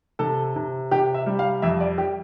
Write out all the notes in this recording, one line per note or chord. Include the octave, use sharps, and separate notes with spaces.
C3 A4
C3
C3 G4
E5
G3
F5
F2 E5
D5
G4